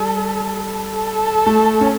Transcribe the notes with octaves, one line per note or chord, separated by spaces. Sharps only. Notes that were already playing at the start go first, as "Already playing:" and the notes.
Already playing: G3 A4
A4
A3
C#4